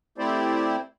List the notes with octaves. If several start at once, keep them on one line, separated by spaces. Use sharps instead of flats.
A3 C4 E4 G4 C5 D5